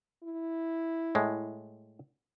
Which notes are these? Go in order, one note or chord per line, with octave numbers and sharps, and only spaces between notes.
E4
A2 G#3